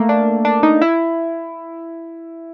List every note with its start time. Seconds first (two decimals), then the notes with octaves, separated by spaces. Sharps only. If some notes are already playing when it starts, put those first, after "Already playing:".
Already playing: A3 A#3
0.09 D4
0.45 D4
0.63 D#4
0.82 E4